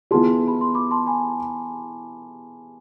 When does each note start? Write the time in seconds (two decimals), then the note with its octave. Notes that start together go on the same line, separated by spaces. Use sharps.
0.11 E3 B3 F4 G#4 A5 C6
0.48 B5
0.61 C6
0.75 B5 D6
0.91 A5 C6
1.07 G#5 B5